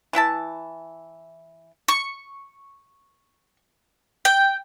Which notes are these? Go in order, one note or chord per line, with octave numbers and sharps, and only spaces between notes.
E3 E4 E5 A5
C#6
G5